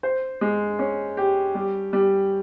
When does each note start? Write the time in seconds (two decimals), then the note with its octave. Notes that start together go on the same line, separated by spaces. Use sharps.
0.03 C5
0.41 G#3
0.79 C#4
1.17 G4
1.55 G3
1.93 G3